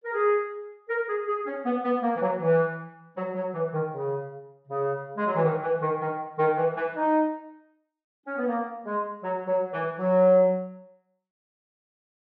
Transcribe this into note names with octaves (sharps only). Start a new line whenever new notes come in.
A#4
G#4
A#4
G#4
G#4
C#4
B3
B3
A#3
E3
F#3
E3
F#3
F#3
E3
D#3
C#3
C#3
G#3
F#3
E3
D#3
E3
D#3
D#3
D#3
E3
E3
D#4
C#4
B3
A#3
G#3
F#3
F#3
E3
F#3